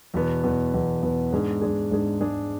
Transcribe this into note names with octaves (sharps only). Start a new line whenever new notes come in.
E2 B2 B3
E2 B2 B3
E2 B2 B3
E2 B2 B3
G#2 G#3 D4 G#4
G#2 G#3 D4 G#4
G#2 G#3 D4 G#4
G#2 G#3 D4 G#4